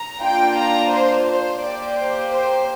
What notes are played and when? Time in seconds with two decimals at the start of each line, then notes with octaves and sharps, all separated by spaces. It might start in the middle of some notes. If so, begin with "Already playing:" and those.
Already playing: A#5
0.21 A#3 D4 F4 G5
0.56 A#5
0.91 C5
1.26 C5
1.62 A#3 G4 D5
1.97 C5
2.32 C5